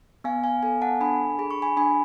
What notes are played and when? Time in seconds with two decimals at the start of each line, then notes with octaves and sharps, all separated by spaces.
0.24 B3 F5 G#5
0.44 F5 G#5
0.63 A4 F5 G#5
0.82 F#5 A5
1.00 D4 G#5 B5
1.39 G#4 B5
1.51 C#6
1.62 G#5 B5
1.77 D4 G#5 B5